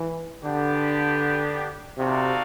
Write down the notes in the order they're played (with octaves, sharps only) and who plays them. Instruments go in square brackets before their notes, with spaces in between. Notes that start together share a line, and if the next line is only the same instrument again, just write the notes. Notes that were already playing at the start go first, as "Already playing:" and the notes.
Already playing: [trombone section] E3
[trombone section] D3 [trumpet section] B3 D4 G4
[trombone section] C3 [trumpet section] D#4 F#4 A4 D5 F5